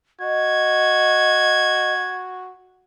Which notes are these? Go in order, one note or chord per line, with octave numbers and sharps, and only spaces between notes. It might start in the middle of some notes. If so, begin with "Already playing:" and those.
F#4 D#5 G#6